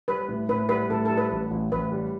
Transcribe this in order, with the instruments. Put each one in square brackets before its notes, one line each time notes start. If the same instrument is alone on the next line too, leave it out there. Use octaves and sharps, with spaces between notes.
[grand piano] G3 [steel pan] B4
[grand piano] A2
[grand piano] A2 [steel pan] B4
[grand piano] G3 [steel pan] B4
[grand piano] A2 [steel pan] A4
[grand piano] G3 [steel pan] A4
[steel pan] B4
[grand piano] A1
A1
[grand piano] A1 [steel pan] B4
[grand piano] G3